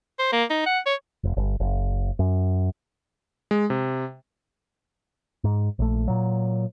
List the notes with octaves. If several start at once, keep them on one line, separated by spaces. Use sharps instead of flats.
C5
A#3
D#4
F#5
C#5
F1
G1
F#1
F#2
G#3
C3
G#2
A#1 A3
A#2 F#3